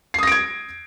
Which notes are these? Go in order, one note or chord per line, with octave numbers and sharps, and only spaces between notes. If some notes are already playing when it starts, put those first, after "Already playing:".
D#6 G#6 A#6 C7 D7